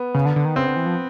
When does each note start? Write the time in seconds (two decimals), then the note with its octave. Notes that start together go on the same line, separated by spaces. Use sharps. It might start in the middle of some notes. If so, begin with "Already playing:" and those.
Already playing: B3
0.14 C#3
0.25 D3
0.36 D3
0.45 D#3
0.56 C#3 C4
0.66 D3
0.76 E3
0.86 F3